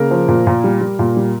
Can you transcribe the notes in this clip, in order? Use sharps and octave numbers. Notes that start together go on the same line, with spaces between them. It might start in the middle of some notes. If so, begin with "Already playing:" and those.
Already playing: C#3 A#3 A#4
F3
A#2
A#2
G3
G3
A#2
G3